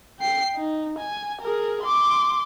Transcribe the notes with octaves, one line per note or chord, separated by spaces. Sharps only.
G5 C7
D#4
G#5
G#4 A#4
C6 D6